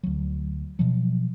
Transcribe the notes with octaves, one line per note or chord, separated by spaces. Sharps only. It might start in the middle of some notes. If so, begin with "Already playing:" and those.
D2 F#3
B2 F3 F#3